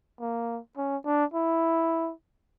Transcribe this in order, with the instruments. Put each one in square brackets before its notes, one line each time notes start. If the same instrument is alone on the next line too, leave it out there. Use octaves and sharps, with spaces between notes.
[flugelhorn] A#3
C#4
D4
E4